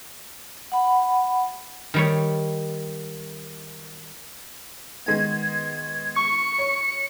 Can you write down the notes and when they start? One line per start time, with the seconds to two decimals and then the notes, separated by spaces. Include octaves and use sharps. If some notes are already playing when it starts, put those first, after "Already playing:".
0.72 F#5 B5
1.94 D#3 G3 C#5
5.06 D#3 G#3 B3 G#6
6.16 C#6 C#7
6.58 C#5